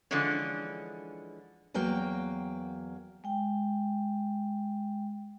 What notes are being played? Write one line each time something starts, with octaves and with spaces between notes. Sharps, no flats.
D3 E3 F3 G#3 C#4
E2 F#3 A#3 G5
G#3 G5